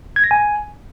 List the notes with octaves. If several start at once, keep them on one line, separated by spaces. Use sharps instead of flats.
G#6
A#6
G#5